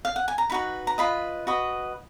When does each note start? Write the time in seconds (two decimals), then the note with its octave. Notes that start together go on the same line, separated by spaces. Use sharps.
0.05 F5
0.16 F#5
0.28 G#5
0.38 A#5
0.50 D#4 F#4 B4 B5
0.87 A#5
0.98 F4 B4 D#5 B5
1.47 F#4 B4 D#5